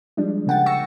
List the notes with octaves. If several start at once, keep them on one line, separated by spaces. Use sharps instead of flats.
F3 G3 G#3 D4
C#3 A#3 F#5 G5 A6
C#6 E6 A#6 C#7